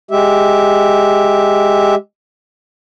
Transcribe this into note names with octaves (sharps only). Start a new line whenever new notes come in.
G#3 G4 E5